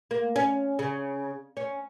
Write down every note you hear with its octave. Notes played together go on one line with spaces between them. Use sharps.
A#3
C#4
C#3
C#4